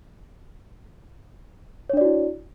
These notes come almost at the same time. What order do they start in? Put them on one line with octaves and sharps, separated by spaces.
C#5 D4 D5 F#4 E4